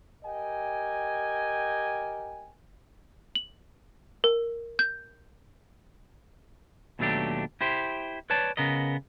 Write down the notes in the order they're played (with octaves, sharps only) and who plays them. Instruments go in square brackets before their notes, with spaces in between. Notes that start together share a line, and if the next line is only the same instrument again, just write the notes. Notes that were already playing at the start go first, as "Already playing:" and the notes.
[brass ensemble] G4 A#4 D#5 G5 G#5
[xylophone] F#7
A#4
G6
[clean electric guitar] D#2 B2 F#3 A3 D4 G4
E4 G4 C5
B4 C#5 D5 A5
C#3 B3 A#4 D#5